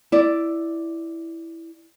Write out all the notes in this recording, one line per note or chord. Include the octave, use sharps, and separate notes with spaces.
E4 D5